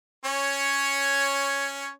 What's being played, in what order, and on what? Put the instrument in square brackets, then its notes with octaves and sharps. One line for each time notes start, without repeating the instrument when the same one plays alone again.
[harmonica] C#4 C#5